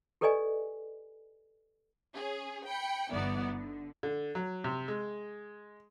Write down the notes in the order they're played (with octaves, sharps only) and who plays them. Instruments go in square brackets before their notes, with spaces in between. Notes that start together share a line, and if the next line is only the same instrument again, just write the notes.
[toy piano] G4 A4 B4 D5 D#5 G#5
[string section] C#4 G#4
G5 B5 C#7
G1 E3 B3 D#4 E4 D5
D3
[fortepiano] D3
F#3
C3
G#3